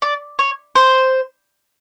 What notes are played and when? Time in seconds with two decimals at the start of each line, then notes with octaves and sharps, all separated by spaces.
0.02 D5
0.39 C#5
0.75 C5